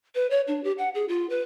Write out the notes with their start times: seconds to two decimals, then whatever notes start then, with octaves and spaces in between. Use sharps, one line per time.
0.15 B4
0.30 C#5
0.48 D4
0.64 G4
0.78 F#5
0.95 G#4
1.08 F4
1.30 B4